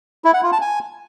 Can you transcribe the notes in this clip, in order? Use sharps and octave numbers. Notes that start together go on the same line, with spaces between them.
E4
F#5
F4
A5
G#5